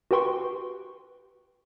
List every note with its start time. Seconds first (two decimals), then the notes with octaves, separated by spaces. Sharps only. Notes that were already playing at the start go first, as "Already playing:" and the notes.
0.11 F#4 G4 B4 G5 C6 C#6